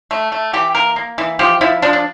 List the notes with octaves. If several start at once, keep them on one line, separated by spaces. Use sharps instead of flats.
A3
A3
E3 G4
A#3 A#4
A#3
E3
F3 G4
F3 E4
F3 D4
D4